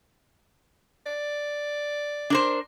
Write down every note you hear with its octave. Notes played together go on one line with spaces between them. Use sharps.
D5
D4 A#4 C5